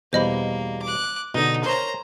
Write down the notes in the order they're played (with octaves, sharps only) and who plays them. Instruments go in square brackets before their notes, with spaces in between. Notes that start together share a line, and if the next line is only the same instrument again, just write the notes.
[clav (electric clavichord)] E2 B2 G3 [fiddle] A#3 [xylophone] C5 D#5 B5
[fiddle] D6 F#6
[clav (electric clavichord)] B2 D3 [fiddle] D#4
[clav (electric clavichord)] A#4 C#5 [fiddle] C5 A#5